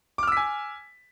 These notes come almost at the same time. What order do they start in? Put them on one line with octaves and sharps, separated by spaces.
D6 F6 E6 B6 G#5